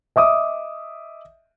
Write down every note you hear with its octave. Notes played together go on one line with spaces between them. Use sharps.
D#5 E5 D6 D#6